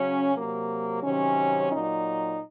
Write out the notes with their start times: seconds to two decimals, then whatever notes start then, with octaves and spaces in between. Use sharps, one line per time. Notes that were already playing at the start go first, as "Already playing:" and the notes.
Already playing: C#3 F#3 C#4
0.35 C3 F#3 A#3
1.03 C3 D#3 F#3 C#4
1.71 A#2 F#3 D#4